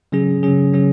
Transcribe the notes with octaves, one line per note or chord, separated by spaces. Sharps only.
C#3 F#3 C#4 G#4
C#3 F#3 C#4 G#4
C#3 F#3 C#4 G#4